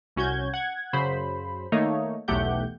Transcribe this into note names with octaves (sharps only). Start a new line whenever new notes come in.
C2 C#4 F#4 G6 G#6
F#5 G#6
F#2 C#3 F#3 C5 B5
D#3 A3 A#3 D#4 C#5
B1 E2 A3 G4 F#5 G6